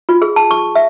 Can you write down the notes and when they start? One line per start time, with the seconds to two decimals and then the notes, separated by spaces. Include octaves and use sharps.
0.09 F4
0.22 G#4
0.36 A5
0.51 C#6
0.76 E5